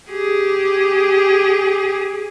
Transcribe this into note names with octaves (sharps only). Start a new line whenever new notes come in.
G4 G#4